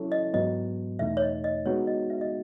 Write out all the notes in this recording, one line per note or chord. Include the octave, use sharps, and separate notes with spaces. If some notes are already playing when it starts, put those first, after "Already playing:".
Already playing: F#3 C#4 E4 A4 C#5
D#5
G#2 F#3 B3 D#5
E2 B2 A3 D#4 E5
C#5
D#5
D#5
G#3 B3 D#4 F#4 C#5
D#5
E5
D#5